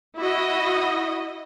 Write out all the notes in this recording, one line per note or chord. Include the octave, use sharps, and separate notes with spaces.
E4 F#4 D#5